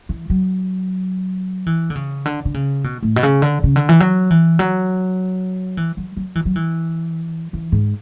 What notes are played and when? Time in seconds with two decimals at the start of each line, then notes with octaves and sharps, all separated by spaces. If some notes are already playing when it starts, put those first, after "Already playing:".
0.09 E3
0.30 F#3
1.66 E3
1.90 D3
1.95 C#3
2.26 D3
2.45 D3
2.54 C#3
2.84 B2
3.03 A2
3.16 B2
3.23 C#3
3.42 D3
3.64 C#3
3.76 D3
3.89 E3
4.00 F#3
4.31 E3
4.59 F#3
5.77 E3
5.97 F#3
6.17 F#3
6.35 E3
6.45 F#3
6.56 E3
7.53 E3
7.72 G#2